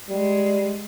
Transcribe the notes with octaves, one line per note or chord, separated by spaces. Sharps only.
G3 G#3